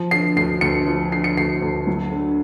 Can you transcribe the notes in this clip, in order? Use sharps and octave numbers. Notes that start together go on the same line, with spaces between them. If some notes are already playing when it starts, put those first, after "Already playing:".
Already playing: F3
D3 C7
D2 C7
D2 C#7
F3
D3 C7
C#7
D2 C7
D2
F#3
D3